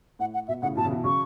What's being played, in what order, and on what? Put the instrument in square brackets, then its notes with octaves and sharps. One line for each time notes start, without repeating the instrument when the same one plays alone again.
[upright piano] A2 [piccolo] F#5
[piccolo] F#5
[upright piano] B2 [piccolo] E5
[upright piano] A2 C#3 [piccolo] F#5
[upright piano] B2 E3 [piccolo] A5
[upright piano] C#3
B2 E3
[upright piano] C#3 F#3 [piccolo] C#6